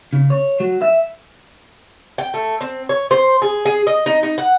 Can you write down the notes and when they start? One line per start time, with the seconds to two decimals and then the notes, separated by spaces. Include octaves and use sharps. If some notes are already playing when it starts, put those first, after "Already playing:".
0.13 C#3
0.30 C#5
0.60 F#3
0.82 E5
2.18 G5
2.34 A3
2.61 C4
2.89 C#5
3.11 C5
3.42 G#4
3.65 G#4
3.87 D#5
4.06 D#4
4.23 D#4
4.38 F#5